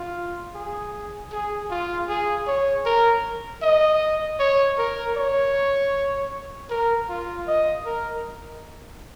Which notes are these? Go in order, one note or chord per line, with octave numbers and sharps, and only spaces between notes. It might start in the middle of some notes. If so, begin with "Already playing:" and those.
Already playing: F4
G#4
G#4
F4
G#4
C#5
A#4
D#5
C#5
A#4
C#5
A#4
F4
D#5
A#4